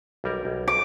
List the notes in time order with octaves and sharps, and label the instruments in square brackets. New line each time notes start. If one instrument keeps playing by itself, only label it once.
[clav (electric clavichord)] B1 G3 A#4
B1
[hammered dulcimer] D6